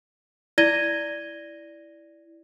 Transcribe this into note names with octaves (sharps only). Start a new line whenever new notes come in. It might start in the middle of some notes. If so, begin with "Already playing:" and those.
E4 D5 G#6 A#6 D#7 G7